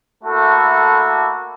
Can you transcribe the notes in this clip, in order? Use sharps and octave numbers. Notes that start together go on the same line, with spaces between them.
A3 A#3 E4 F#4 A4